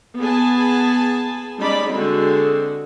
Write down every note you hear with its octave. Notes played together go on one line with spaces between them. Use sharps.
B3 G#4 G#5 A5 B5
G3 G#3 C#4 D#4 D5 B5
D3 G#3 C4 F#4 G#4 A4